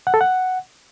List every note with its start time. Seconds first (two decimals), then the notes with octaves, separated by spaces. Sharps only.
0.07 F#5
0.14 A4
0.21 F#5